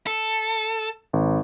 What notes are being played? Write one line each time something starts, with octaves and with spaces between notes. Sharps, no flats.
A4
G#1